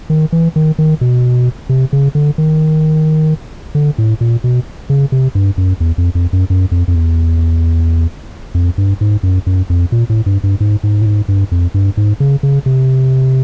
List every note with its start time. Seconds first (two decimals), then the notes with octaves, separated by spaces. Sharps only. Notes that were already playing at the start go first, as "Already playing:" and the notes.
0.10 D#3
0.33 E3
0.56 D#3
0.79 D#3
1.01 B2
1.69 C3
1.93 C#3
2.15 D3
2.38 D#3
3.75 D3
3.98 A2
4.21 A#2
4.44 B2
4.90 C#3
5.12 C3
5.35 G2
5.58 F#2
5.80 E2
5.98 F2
6.15 F2
6.33 F#2
6.50 F#2
6.72 F2
6.88 F2
6.95 E2
8.54 F2
8.78 G2
9.01 G#2
9.23 F#2
9.47 F#2
9.70 F2
9.92 A#2
10.10 A2
10.26 G2
10.43 G2
10.60 G#2
10.83 G#2
11.02 A2
11.06 G#2
11.28 G2
11.51 F2
11.74 G2
11.97 G#2
12.20 C#3
12.43 C#3
12.66 C3